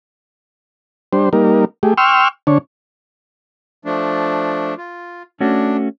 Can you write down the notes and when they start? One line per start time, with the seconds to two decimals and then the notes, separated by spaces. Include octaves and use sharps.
1.13 G3 D4 C5
1.33 G3 A#3 D#4 A#4
1.83 A3 G4 G#4
1.98 G5 C6 C#6 E6 F6
2.47 D3 D4 C#5
3.85 F3 A3 D4
4.78 F4
5.41 A3 C#4 D4 F#4